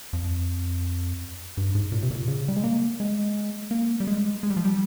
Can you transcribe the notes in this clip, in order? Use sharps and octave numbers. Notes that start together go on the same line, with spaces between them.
F2
G2
G#2
A#2
C3
A#2
C#3
G3
G#3
A#3
G#3
A#3
G3
G#3
G#3
G3
F3
G3